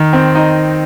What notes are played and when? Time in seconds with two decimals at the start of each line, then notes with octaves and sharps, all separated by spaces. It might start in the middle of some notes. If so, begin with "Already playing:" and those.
Already playing: D#3
0.13 C4
0.35 D#4